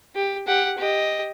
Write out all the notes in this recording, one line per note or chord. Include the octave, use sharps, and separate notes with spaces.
G4
G4 F#5
G4 D#5